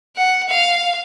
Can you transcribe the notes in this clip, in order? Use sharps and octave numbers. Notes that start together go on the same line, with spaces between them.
F#5
F5